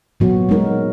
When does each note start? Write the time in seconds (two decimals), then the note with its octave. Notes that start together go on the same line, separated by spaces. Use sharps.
0.20 A#2 F#3 B3 F#4
0.49 G#3 D#4 A#4